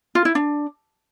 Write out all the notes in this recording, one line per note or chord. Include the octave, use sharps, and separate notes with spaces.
F4
E4
D4